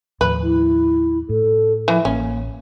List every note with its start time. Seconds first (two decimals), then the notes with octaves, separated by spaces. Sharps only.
0.21 D#2 A2 F3 B4
0.43 E4
1.29 A2 A4
1.88 E3 F3
2.05 A1 A#3 C#4